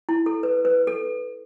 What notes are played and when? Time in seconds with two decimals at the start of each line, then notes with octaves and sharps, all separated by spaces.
0.09 E4
0.26 A4
0.43 B4
0.65 B4
0.87 A4